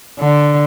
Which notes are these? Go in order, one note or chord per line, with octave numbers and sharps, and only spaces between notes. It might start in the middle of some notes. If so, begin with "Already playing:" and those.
D3